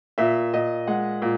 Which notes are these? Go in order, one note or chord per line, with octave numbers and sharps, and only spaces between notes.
A#2 E5
A#2 D#5
G#3 F#5
A#2